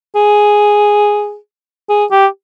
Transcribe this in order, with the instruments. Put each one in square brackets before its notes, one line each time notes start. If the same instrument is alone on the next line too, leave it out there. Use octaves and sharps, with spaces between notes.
[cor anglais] G#4
G#4
G4